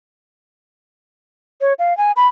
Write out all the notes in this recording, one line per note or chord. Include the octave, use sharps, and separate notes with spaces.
C#5
F5
G#5
B5